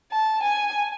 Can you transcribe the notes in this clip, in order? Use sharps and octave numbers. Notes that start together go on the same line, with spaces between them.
A5
G#5